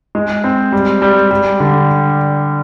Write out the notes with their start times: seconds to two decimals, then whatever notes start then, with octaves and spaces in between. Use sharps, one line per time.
0.15 G#3
0.44 C4
0.72 G3
1.02 G3
1.31 G3
1.60 D3